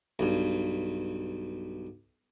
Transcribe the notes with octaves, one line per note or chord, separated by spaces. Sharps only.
B1 G2